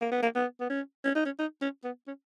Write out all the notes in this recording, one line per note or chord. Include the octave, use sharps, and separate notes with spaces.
A#3
B3
A#3
B3
B3
C#4
C#4
D#4
C#4
D#4
C#4
B3
C#4